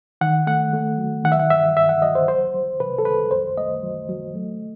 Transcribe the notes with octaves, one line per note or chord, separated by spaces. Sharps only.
D#3 F#5
A3 F#5
A3
F#3
D#3 F#5
E5
F#5
G2 E5
G2 E5
F#5
F#3 D#5
C5
C2 C5
F#3
C3 B4
A4
C2 B4
F#2 C5
A3 D#5
F#3
F#3
A3